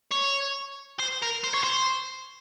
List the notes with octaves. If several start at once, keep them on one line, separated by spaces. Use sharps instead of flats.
C#5
C5
A#4
C5
C#5
C5